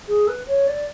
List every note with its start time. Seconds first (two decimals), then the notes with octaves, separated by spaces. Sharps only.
0.08 G#4
0.28 B4
0.47 C#5
0.67 D5